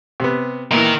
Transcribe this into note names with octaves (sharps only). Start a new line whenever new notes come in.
C3 B3
A#2 D#3 E3 A#4